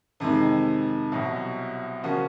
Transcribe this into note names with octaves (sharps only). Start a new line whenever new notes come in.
F2 C3 D#3 G#3
C2 B2 F#3
C#3 F3 A#3 C#4 F#4